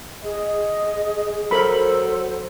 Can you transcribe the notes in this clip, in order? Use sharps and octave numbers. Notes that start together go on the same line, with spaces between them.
G#4 D#5
F#3 A4 A#4 C5 B5